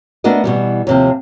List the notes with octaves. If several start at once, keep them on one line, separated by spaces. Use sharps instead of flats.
A3 B3 D4 F#4 A#4 D#5
B2 E3 G3
D#2 C3 F3